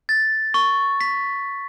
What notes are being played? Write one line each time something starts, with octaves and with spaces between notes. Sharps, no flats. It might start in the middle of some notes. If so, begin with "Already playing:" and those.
A6
C#6
B6